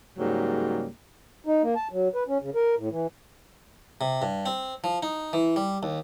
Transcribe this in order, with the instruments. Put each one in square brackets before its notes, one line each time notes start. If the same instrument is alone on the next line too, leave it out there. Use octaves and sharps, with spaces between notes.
[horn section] G#2 C#3 F#3 G3 A#3
[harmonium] D#4
A#3
A5
F#3
B4
C#4
C#3
A#4
A2
E3
[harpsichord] C3
G2
C4
F3
D#4
E3
G3
D#2